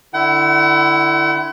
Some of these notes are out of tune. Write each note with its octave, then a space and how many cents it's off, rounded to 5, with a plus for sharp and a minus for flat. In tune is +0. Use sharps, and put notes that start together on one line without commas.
D3 +25 E4 +5 F#5 +45